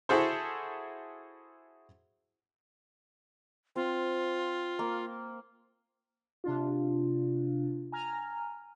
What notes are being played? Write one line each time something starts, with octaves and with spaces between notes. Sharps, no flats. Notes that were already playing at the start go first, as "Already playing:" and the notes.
E4 F#4 G#4 A4 C5
C4 F4
A#3
C3 D4 F4
G#5 A#5 F6